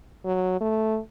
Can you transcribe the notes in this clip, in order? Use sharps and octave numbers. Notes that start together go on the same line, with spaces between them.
F#3
A3